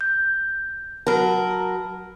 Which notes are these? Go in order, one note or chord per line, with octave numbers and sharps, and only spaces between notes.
G6
F#3 A#4 A5 B5 F6